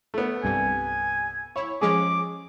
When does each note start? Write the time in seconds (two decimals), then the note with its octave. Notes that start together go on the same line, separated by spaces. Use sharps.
0.14 A3 B3
0.44 C2 G2 G3 G#5
1.56 E4 C#5
1.81 F3 G#3 C#4 G#4 D6